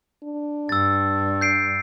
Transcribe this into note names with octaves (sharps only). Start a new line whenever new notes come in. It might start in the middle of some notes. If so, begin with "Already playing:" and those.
D4
G2 E6 A6
G6 C7 D7